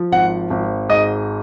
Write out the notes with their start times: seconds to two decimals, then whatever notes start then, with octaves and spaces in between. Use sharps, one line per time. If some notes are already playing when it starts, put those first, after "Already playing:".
Already playing: F3
0.12 G#1 F#5
0.50 G#1
0.89 G#2 D#5